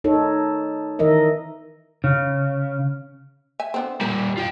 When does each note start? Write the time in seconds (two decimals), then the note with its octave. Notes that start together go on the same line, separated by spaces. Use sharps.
0.04 D#4 A4 C#5
0.99 D#3 E3 A#4 D#5 E5
2.04 C#3
3.60 E5 G#5
3.74 D3 B3 C4
4.01 A#2 G3 A#4
4.37 F4 G5